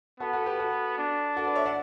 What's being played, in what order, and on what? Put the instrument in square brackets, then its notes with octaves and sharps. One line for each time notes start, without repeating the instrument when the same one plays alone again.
[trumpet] B3 [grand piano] F#4 A4
[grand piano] F#4 A4
G4 B4
F#4 A4
[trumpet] D4
[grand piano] F#4 A4
B4 D5
C#5 E5
D5 F#5